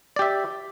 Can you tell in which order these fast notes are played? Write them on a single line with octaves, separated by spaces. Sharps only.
D5 G4 E5